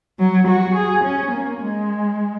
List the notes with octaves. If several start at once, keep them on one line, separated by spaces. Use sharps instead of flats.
F#3
F#4
G#4
C#4
A#3
G#3